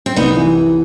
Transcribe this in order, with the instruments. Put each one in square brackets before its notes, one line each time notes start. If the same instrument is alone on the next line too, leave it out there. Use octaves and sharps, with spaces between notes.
[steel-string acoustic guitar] C4
[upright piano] C2 [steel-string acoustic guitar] B3 D#4
[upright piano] E3